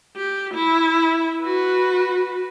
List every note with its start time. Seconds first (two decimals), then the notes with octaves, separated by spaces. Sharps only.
0.17 G4
0.54 E4 E5
1.42 F#4 B4